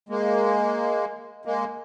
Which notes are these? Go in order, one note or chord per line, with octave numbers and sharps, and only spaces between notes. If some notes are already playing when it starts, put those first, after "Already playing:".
G#3 A#3
G#3 A#3